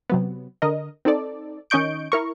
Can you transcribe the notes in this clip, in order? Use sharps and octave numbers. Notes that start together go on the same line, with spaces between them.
C3 F#3 B3
D3 A#4 D#5
C4 D#4 A4 D5
D#3 C#4 D#5 C#6 G6 D7
E4 A#4 C#6